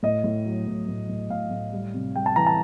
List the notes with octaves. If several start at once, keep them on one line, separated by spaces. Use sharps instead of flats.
A2 D#5
A2
F#3
A2
A2
A2
A2 F5
A2
G3
C3
G3 G5
A5
E3 A#5
A5